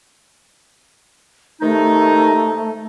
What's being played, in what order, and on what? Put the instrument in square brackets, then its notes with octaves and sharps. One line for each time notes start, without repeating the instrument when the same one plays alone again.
[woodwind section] C3 D#3 D#4 [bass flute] A3